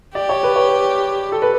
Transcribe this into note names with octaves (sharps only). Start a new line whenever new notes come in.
G4 D5
C#5
B4
C#5
A4
B4